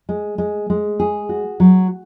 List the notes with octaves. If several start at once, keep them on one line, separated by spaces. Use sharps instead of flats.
G#3
G#3
G#3
G#4
F#4
F#3